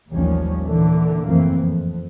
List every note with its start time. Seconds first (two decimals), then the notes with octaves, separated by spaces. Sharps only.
0.12 A1 D#2 F3 G3 C#4
0.63 A#2 D3 E3
1.27 F#1 F2 A2 E3 A#3 C4
1.57 F2